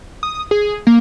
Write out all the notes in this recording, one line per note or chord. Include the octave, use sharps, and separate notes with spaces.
D#6
G#4
A#3